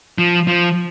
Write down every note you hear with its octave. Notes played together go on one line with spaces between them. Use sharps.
F3
F3